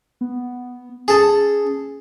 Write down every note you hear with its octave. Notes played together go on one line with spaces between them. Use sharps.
B3
C#4 G#4 A4